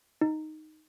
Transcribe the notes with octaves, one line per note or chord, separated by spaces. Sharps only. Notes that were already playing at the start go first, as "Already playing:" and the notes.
D#4